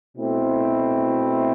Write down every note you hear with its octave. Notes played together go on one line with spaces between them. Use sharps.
B2 A3 C4 E4